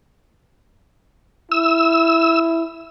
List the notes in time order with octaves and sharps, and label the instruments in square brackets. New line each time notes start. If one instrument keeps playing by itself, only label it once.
[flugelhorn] E4 [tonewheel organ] E6